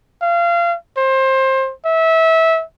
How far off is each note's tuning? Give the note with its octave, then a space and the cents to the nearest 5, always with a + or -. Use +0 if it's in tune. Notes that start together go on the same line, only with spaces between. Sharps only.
F5 -25
C5 +25
E5 -20